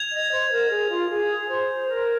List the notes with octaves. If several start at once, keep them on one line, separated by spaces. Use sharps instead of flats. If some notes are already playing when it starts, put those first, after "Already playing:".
Already playing: G#6 F7
D#5
C5
A#4
G#4
F4
G#4
C5
A#4